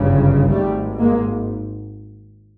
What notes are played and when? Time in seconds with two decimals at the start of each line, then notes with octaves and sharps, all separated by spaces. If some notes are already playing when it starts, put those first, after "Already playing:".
Already playing: G1 F#2 C#3
0.49 G#1 G#2 G3 A3
0.99 G#3 A#3